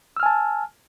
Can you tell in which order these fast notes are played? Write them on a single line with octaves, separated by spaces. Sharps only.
E6 F6 G#5 A5